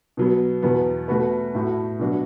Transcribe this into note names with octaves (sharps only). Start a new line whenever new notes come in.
B2 F#3 B3
E2 B2 B3
B2 A3 F#4 B4
A2 A3 F#4
B2 F#3 D4 F#4